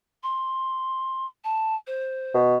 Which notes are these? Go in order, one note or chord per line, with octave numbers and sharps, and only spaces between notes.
C6
A5
C5
B2